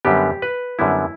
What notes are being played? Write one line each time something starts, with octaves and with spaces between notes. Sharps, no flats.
F#2 D3 G3 B3 G4
B4
F#2 D3 G3 B3 E4